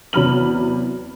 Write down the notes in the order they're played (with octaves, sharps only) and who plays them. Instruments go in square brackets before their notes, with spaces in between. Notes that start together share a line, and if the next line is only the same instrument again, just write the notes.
[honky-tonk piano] E2 C3 F#3 B5 F6 F#7